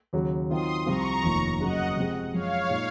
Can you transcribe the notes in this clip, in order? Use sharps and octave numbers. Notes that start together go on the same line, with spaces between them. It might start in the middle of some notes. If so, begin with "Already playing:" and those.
D#2 C#3 F#3
D#3 F#3 C4 F4 C6 D#6
C2 C3 F3 C4 F4 A#5 C#6
F1 D#2 D#3 A#3 F4
F#2 C#3 F#3 A#3 D#5 F#5
C3 F3 G#3 C4
F#2 F3 G#3 C#5 F5
A#2 G#3 D#4